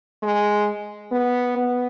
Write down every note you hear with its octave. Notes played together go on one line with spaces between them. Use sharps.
G#3
B3
B3